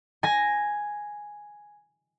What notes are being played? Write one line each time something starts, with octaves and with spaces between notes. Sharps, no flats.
G#5 A#6